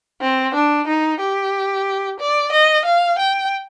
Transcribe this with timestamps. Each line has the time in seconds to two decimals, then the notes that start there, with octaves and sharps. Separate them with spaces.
0.21 C4
0.54 D4
0.88 D#4
1.20 G4
2.20 D5
2.52 D#5
2.85 F5
3.19 G5